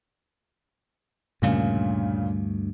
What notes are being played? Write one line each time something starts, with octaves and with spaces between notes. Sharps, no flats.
D2 G2 A#2 C#3 A3